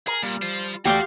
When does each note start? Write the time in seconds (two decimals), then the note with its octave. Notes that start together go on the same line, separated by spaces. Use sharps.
0.07 G#4 A#4
0.23 A#2 G3
0.42 F4 C5
0.85 E2 A3 F#4 G4 D5 F5 G5 C6